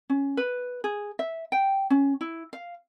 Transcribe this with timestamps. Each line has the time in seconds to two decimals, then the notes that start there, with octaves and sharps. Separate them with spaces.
0.10 C#4
0.37 B4
0.84 G#4
1.19 E5
1.52 G5
1.90 C#4
2.21 E4
2.53 F5